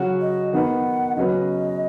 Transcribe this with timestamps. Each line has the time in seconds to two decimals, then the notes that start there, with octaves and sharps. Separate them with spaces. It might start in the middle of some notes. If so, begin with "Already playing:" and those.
Already playing: C#3 F#3 C#4 F#4
0.21 D#5
0.53 D#3 B3 D#4 B4 F#5
1.16 C#3 F#3 C#4 B4 D#5